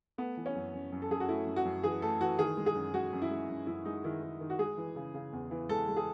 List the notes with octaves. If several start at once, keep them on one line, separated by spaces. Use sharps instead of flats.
A3 B3
E3
C#4
F#2
F#2
F#2
A4
F#2 G#4
F#4
A3 E4
F#2
F#4
F#2
E3 G#4
A3 A4
E3 F#4
D#3 G#4
G#3
G#4
F#2
G#3 F#4
F#2
E4
G#3
F#2
F#2 E4
G#3 D#4
D#3 E4
D#3
D#3
F#4
G#3 G#4
E3
C#3
C#3
E2
E3
G#3 A4
G#3
G#4